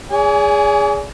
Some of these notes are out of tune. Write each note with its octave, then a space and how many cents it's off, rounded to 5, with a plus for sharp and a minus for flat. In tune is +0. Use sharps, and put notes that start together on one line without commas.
G#4 -10 D5 -45 G#5 +15